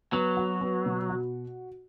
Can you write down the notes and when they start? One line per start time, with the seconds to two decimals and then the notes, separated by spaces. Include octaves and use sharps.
0.13 F#3 B3
0.37 F#4
0.61 B3
0.86 B2
1.10 F#4